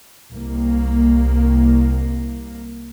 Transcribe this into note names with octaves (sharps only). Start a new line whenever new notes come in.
C2 A#3